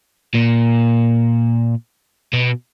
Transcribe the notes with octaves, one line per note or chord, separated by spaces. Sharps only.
A#2
B2